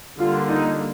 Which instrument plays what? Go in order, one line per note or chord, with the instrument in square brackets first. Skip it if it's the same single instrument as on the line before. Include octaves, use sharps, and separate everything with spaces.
[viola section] D3 G3 A#3 F4
D#4